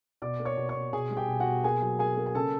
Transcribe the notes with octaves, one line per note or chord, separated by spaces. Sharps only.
B2 D5 D6
A#3
C#5 C#6
B2
C#5 C#6
B2
B2 G#4 G#5
G3
G4 G5
B2
F#4 F#5
B2
A#3 G#4 G#5
F#3
A#3 G#4 G#5
A#3
G#5
C#3 A4 A5